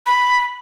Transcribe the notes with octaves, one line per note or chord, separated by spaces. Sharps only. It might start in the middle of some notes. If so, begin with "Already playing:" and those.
B5